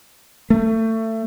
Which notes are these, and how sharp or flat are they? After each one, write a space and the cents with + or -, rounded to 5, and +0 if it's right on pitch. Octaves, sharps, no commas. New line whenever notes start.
A3 +25